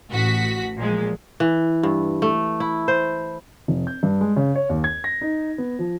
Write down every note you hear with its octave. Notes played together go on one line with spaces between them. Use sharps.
A1 F#4 B6
A#2 F3 G#3
E3
G2
A3
E4
C5
F1
G6
G2
G#3
C#3
C#5
D#2
G#6
A#6
D#4
B3
F3